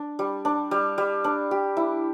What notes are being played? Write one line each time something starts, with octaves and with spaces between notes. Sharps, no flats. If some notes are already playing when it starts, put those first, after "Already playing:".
Already playing: D4
G3
D4
G3
G3
D4
G4
E4